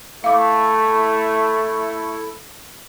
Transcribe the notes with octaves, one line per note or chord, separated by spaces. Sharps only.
A3 E4 A4 E5 F5 D6